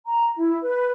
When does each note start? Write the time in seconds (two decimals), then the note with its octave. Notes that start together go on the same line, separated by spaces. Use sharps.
0.06 A#5
0.35 E4
0.62 B4